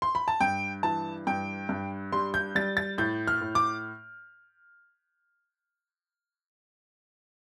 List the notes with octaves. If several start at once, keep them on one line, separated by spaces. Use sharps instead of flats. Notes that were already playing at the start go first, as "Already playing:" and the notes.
C6
B5
A5
G2 G5
E3 A5
G2 G5
G2
G3 C6
G6
G3 A6
A6
A2 G6
F6
A2
D6